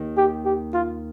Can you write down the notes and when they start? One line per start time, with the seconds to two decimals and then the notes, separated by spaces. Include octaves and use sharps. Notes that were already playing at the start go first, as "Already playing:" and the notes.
Already playing: D#2 D#3
0.17 G4
0.45 G4
0.74 F4